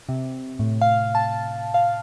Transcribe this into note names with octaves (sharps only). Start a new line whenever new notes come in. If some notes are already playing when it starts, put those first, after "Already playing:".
C3
A2
F5
A5
F5